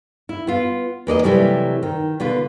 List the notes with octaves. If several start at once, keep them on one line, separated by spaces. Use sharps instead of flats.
E4
B3 F4
E2 A#3 D5 D#5
C3 E3 F#3 G3 A3 E4
D#3
B2 D3 F4 B4